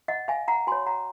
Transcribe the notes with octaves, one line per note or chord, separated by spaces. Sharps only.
D#5 F#5
F5 G#5
F#5 A#5
F#4 C#5 G#5 C6
F#5 A#5